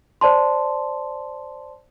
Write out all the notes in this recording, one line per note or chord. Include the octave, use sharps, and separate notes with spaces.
C5 D5 A5 C6